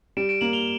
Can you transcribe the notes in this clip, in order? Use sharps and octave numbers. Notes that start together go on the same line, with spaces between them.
G3 D7 E7
D7 E7
A#3 E7 F#7
F7 G7